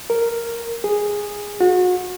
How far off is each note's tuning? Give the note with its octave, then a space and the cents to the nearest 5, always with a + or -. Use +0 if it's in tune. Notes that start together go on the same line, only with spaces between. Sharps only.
A#4 -5
G#4 -10
F#4 -35